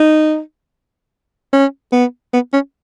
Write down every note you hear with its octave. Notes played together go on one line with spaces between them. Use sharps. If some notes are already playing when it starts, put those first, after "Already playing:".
Already playing: D#4
C#4
B3
B3
C#4